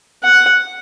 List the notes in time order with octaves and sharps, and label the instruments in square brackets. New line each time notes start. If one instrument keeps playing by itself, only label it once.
[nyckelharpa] F#5